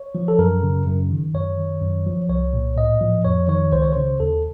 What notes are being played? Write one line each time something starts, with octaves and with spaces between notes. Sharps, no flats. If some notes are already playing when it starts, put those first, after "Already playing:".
Already playing: C#5
F3
A4
F#2 A#4
C#3
F#2
D#3
F#2 C#5
D#3
F#2
F3
C2 C#5
A#2
A2 D#5
F3
F2 C#5
D#3 C#5
C#2 C5
C#5
C#3 C5
D#2 A4